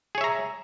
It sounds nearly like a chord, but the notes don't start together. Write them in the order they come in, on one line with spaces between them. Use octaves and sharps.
G#4 C#5 E5 A#5